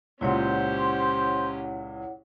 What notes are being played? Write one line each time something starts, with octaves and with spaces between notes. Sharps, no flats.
C#2 A#2 C#4 E4 G4 C5 C#5 F#5